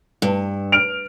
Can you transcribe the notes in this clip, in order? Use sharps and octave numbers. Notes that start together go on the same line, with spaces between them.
G2
F6 D7 F7